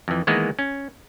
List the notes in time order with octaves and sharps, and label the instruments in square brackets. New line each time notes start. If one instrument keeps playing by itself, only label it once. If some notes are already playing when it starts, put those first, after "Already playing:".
[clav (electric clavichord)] F2 E3
D#3 E3 G#3 A#3 B3
C#4